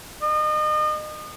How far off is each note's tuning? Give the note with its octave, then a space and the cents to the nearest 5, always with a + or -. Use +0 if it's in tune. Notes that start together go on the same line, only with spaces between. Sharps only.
D#5 -35